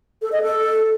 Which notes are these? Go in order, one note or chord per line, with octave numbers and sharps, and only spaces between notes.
A4
D#5
A4